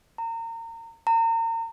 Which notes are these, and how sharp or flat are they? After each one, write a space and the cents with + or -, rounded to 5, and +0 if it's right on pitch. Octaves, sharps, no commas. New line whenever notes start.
A#5 -30
A#5 -35